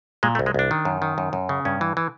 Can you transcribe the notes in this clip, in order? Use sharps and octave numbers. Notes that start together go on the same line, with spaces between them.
A#2 G#3
A3
C2
G#3
C2 D4
D#3
F#2
D#3
F#2
F#2
C#3
G2 C#4
E3
E3